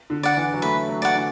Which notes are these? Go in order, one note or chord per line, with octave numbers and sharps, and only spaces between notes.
D3
D5 F#5
E3
F#3
A3 B4
F#3
D5 F#5
D3